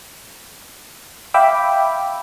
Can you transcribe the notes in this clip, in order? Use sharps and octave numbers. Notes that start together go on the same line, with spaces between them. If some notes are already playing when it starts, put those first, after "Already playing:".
E5 F5 G5 B5 D6 E6